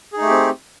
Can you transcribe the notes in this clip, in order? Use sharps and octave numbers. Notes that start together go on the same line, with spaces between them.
A3 C4 D#4 G4 G#4